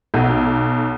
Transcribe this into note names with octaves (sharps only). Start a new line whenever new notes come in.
B1